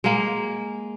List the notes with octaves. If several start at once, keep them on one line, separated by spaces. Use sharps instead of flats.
G#3 A#3